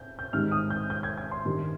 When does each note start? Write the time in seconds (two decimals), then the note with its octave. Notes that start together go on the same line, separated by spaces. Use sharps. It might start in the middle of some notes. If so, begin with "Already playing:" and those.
Already playing: G6
0.19 G6
0.33 G#2 D#3 G3 C4 D#4 F6
0.51 D#6
0.70 G6
0.90 G6
1.03 G#6
1.18 G#6
1.31 C6
1.45 G2 D#3 G3